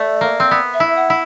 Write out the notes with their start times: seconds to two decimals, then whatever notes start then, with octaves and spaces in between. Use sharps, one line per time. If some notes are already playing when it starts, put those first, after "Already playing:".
Already playing: A3 D5
0.21 A#3
0.40 C4
0.51 B3
0.74 E5
0.80 E4
0.96 F#5
1.10 E4